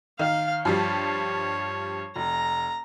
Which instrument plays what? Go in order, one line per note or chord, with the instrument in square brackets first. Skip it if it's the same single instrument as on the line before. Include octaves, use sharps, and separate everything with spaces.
[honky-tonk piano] D#3 [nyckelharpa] F5
[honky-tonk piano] G2 F3 G3 [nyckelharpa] C#5
[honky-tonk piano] F1 [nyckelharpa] A#5